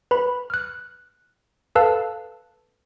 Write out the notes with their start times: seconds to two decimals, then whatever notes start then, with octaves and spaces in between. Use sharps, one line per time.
0.11 B4 B5
0.50 F6 F#6
1.75 A4 B4 F5 A5 E6 F#6